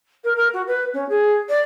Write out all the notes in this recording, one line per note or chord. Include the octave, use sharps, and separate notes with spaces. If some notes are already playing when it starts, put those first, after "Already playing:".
A#4
A#4
F#4
B4
C#4
G#4
D5